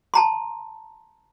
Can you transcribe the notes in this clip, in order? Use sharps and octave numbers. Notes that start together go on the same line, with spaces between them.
A5 A#5 C6